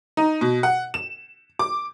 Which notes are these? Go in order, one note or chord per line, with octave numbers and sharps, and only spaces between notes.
D#4
B2
F#5
E7
D6